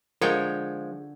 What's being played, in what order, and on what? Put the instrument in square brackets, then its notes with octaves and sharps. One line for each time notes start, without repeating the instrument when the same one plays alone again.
[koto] D3 C#5 G5 [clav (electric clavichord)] F3 G#3 [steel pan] A#4